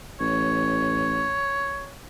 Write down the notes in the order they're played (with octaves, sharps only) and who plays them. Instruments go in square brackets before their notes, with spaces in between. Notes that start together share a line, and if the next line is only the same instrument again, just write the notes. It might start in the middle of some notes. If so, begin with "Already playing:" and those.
[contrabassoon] A1 [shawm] C#5